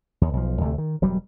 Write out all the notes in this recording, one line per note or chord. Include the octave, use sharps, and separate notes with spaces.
D#2
B1 F3
D2 C3 A3
D#3
E1 G2 F#3 G3